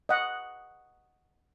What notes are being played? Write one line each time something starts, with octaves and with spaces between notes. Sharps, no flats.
D#5 F#5